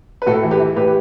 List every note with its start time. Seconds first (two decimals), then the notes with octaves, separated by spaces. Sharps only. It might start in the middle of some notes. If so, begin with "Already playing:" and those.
0.22 B4
0.26 A2 F#4 A4
0.43 E3
0.51 G4 B4
0.60 E3
0.76 A2 G4 B4